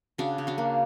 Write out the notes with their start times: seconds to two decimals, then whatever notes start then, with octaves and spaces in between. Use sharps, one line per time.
0.18 C#3 D4 F#4
0.38 C#3
0.47 D4 F#4
0.58 A#3